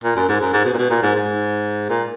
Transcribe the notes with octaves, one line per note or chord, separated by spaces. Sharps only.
A#2
F#2
G#2
F#2
G#2
B2
A#2
B2
A#2
G#2
G#2
A#2